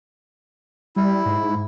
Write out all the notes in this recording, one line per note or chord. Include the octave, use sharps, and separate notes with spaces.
G3 E4
G#2